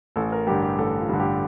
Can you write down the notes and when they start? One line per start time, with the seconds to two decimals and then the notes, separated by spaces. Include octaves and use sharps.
0.16 A1 A4
0.32 A#4
0.47 G2 G4
0.50 D3
0.62 G4
0.78 A1 A4
0.99 F4
1.09 G2 D3
1.20 G4